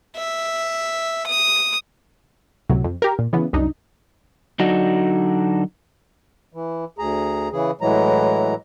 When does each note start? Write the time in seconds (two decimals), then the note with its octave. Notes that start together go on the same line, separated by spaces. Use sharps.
0.16 E5
1.27 D#6
2.70 C#2 A2 C3 F#3
2.84 F2
3.02 G4 A#4
3.19 A#2
3.33 C#3 E3 B3
3.53 C2 F#2 D4 D#4
4.60 D3 F#3 D4 D#4 F#4
6.53 E3
6.98 D2 G#4 A#5
7.52 C#3 E3 G#4
7.81 A2 E3 F#3 G#3 A#5